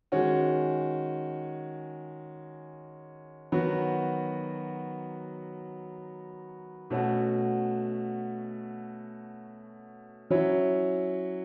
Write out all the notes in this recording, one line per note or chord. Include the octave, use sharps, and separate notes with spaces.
D#3 G#3 C#4 F#4
D#3 F#3 B3 F#4
B2 A3 C#4 F#4
F#3 C#4 E4